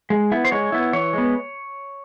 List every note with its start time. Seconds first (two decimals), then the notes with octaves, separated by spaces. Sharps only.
0.10 G#3
0.32 B3 E4
0.45 C5
0.52 G#3 C#5
0.72 B3 E4
0.93 E3 C#5
1.13 G#3 B3